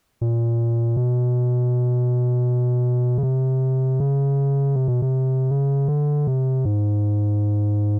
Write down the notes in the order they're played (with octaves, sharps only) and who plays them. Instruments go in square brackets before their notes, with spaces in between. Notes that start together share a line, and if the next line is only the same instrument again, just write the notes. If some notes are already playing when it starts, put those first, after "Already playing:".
[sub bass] A#2
B2
C#3
C3
C#3
C3
B2
C3
C#3
D3
C3
G#2